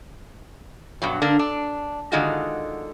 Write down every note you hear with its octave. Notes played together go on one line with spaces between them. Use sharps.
G2 B2 F#3
D3 A#3 D4
D4
D3 D#3 G#3 D#4 F4 F#4